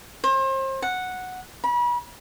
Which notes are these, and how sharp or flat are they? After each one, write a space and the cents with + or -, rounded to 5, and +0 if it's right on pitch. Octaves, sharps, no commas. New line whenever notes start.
C5 +35
F#5 -5
B5 -35